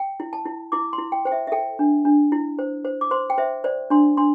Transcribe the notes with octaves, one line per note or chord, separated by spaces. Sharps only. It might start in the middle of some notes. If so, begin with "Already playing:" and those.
Already playing: G5
E4
A5
E4
E4 D6
C6
E4
G5
C5 G5
E5
E5
A4 G5
D4
D4
E4
C5
C5
D6
C5 C6
G5
C5 E5
C5 D5
D4 C6
D4 C6